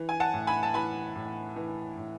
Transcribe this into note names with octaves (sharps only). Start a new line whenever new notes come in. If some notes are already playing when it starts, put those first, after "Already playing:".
Already playing: E3
G#5
F#5 A5
A2
G#5 B5
A5
E3 G#5 B5
A2
E3
A2